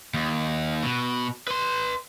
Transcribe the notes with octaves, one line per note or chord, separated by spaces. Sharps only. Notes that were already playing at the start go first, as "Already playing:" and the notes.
D#2
B2
B4 C6